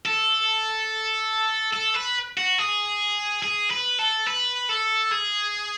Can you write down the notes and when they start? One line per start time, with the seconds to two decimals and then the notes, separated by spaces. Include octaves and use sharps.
0.05 A4
1.74 A4
1.95 B4
2.37 F#4
2.58 G#4
3.43 G#4
3.70 B4
3.99 A4
4.27 B4
4.69 A4
5.12 G#4